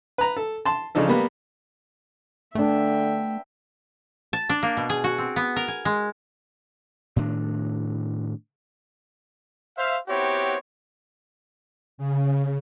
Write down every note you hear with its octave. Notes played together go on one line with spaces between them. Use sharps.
B4 A#5
A4
A5 C6
C#3 F3 D4 D#4 A4
G3 A#3 B3
D3 A3 B3 D4 E5 G5
A5
D4
A#3
B2
G#4
F#4
C4
B3
A#4
G#5
G#3
A2 D#3 C4 D4
C5 E5 F5
B3 C4 E4 F#4 G4 C#5
C#3